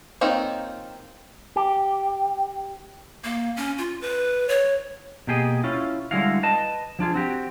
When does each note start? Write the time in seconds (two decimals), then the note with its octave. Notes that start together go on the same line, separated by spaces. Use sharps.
0.21 A#3 C4 D#4 F4 C#5
1.56 G4
3.24 A#3
3.57 C#4
3.78 F4
4.01 B4
4.49 C#5
5.27 B2 A#3 G4 G#4 D#5
5.64 C#4 E4 F4
6.11 D3 G3 G#3 E4 F#4 F5
6.43 B4 D#5 A5
6.99 F3 D4 F4 G#4
7.14 C4 F#4 G4